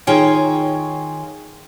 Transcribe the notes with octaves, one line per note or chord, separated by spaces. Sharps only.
D#3 F4 G#4 C#5 F5 G5